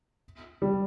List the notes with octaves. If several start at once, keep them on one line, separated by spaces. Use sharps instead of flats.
G3